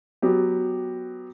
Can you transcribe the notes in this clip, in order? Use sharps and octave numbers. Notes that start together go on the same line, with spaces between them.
F#3 B3 G4